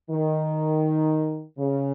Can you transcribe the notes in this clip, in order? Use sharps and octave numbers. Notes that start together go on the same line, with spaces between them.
D#3
C#3